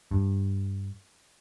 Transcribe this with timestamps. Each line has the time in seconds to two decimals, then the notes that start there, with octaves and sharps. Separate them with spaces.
0.11 G2